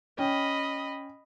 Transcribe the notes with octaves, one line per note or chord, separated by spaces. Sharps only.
C#4 D#5 G5 B5